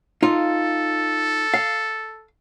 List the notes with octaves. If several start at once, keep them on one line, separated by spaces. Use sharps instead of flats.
D#4 F4 A4
F5